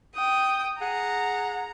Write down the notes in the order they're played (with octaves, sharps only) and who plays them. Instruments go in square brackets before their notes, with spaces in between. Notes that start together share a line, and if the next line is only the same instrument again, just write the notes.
[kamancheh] G5 D#6
[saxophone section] G#4 F#5 [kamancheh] A#5